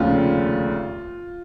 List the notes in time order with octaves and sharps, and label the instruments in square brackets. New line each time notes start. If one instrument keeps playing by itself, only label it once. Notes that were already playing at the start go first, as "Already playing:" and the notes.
Already playing: [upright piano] F1 D#2 C#3 F4